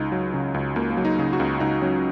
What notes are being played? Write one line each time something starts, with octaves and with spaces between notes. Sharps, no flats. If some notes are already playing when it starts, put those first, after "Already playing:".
Already playing: C#2 D#4
F#3
C#3
C#2
C#2 A#3
A#3
F#3
D#4
C#3
F#4
C#2
C#2 D#4
F#3 C#4